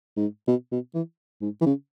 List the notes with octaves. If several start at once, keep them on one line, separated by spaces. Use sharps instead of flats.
G#2
B2
B2
E3
G#2
E3
C#3